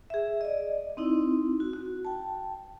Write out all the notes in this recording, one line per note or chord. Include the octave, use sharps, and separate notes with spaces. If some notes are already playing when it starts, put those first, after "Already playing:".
G#4 E5
D5 D#5
C4 D#4 E4
F#4
F#4
G5 A5